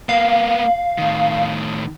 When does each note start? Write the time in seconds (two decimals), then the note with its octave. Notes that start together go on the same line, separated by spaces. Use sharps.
0.09 A#3 B3 F5
0.98 A2 D#3